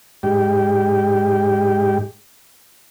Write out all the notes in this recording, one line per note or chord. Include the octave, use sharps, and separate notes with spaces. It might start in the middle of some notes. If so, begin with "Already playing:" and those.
G#2 G4